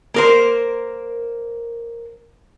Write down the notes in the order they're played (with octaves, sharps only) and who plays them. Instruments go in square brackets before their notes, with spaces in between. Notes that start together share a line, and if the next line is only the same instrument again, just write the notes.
[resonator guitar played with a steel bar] A#3 A#4 C5